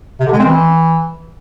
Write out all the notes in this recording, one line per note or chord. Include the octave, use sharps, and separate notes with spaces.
C3
D3
G#3
C4
E3